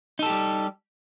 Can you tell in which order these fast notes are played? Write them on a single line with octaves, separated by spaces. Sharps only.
D#4 A4 G4 G3